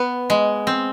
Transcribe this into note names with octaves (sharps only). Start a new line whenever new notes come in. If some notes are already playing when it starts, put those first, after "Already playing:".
Already playing: B3
G#3
C4